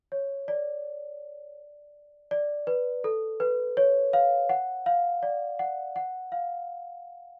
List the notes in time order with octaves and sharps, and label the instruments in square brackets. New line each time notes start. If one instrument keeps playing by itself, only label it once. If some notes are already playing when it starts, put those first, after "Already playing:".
[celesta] C#5
D5
D5
B4
A4
B4
C#5
F5
F#5
F5
D5
F#5
F#5
F5